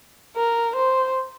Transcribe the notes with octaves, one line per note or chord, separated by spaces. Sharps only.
A#4
C5